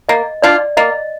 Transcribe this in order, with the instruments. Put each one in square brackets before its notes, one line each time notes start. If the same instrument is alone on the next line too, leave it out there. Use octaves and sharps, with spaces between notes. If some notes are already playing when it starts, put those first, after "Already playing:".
[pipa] A#3 [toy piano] D#5
[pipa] D4 F4 [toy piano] D5
[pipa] A#3 [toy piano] D#5